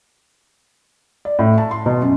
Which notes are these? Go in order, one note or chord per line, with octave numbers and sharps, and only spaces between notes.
D5
A2
A5
C6
B2
F#2